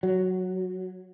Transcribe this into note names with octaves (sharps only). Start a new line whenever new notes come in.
F#3